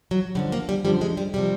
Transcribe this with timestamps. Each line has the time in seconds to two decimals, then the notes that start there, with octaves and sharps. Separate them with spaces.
0.11 F#3
0.35 F#2 D3 F3 G3
0.52 A#3
0.69 G3
0.85 F#2 D3 F3 G3
1.01 G#3
1.17 G3
1.34 C3 F3 G3